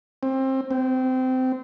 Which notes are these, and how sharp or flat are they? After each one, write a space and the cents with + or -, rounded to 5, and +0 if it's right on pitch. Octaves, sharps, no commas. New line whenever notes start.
C4 +25
C4 -20